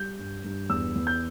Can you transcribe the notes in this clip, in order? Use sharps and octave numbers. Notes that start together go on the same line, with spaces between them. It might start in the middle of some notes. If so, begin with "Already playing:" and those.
Already playing: G3 G6
G2
G2
E2 E6
E2
G6